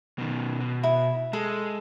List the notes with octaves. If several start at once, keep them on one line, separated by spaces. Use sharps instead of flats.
B2 D#3
B2
E4
G#3 A4